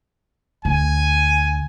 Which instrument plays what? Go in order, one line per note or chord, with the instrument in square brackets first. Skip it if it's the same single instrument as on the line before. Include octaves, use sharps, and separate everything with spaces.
[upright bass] D2 [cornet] G#5